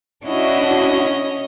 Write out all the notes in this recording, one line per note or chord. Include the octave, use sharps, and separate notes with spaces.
C#4 D4 E4 F#4 D#5